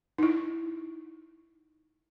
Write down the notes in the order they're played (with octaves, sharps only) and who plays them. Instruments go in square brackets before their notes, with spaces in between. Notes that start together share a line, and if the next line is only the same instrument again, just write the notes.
[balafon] D#4 E4